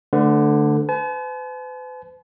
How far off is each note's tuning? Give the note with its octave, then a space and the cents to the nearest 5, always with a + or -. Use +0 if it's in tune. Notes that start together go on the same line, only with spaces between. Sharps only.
D3 +5 A3 +0 B4 +45
B4 +45 A5 -45